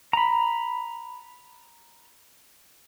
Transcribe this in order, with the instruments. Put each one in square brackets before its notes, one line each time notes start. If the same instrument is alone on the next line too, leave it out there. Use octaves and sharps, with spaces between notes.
[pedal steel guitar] A#5 B5